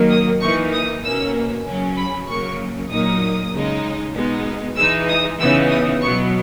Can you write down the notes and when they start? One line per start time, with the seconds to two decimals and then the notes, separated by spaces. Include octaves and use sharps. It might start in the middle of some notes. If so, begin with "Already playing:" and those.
Already playing: D#3 F#3 A#3
0.10 D#6
0.41 E3 A#3 D#4 C#6
0.72 D#6
1.03 B2 A#3 C#4 E6
1.65 C#3 F#3 C#4
1.97 B5
2.28 C#3 F#3 A#3 C#6
2.90 A#2 F#3 A#3 D#4 D#6
3.52 C#3 G#3 D#4
4.14 B2 G#3 B3 D#4
4.77 E3 G#3 D#4 E6
5.08 D#6
5.39 C#3 E3 B3 D#4 E6
5.70 D#6
6.01 B2 F#3 B3 C#6